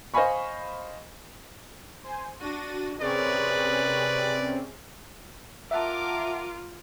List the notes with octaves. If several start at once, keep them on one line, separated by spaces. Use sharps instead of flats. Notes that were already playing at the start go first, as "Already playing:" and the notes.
C5 D#5 F5 G#5 B5 C#6
C5 G#5
D4 F#4 A6 A#6 D#7
C3 C4 C#4 G#4 A#4 B4 C#5 D5
F4 A#4 E5 F#5 A5 D6